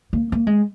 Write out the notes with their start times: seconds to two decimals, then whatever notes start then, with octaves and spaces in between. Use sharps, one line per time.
0.13 A#3
0.32 A#3
0.47 G#3